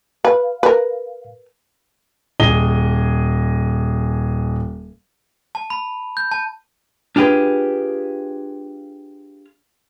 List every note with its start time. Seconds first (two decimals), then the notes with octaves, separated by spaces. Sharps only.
0.25 B4 F5
0.63 A#4 B4
2.40 D#1 G#4 D#5 G7
5.55 A5
5.70 B5
6.17 G6
6.31 A5
7.16 D4 F4 G4 G#4 B4